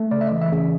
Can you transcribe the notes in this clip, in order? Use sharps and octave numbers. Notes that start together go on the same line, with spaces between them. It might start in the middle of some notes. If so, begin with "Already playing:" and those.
Already playing: A3
C#3 D5
E5
D#5
E3
E5
C#3